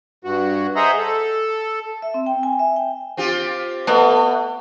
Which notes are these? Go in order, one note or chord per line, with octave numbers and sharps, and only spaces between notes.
G2 F#4
G#4 C5 D#5 E5 F#5 A#5
A4
E5
C4
G5
G#5
E5
G5
C4 F4 G4
B2 A3 B3